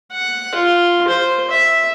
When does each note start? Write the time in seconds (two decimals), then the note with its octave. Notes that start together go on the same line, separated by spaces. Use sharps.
0.12 F#5
0.54 F4
1.08 C5
1.50 E5